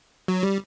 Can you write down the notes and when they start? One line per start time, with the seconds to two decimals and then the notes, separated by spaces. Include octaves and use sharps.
0.28 F#3
0.43 G3